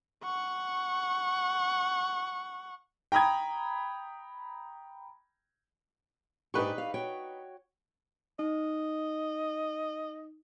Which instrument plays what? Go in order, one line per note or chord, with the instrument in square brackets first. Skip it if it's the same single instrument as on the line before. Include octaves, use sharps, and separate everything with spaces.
[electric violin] F#5 C#6
[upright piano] G5 A#5 B5 D#6 G#6
[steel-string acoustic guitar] G#2 D4 G4 [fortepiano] D#4 B4 C#6
[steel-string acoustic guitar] F5
F#4 C#5 G5
[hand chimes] D#4 [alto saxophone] D#5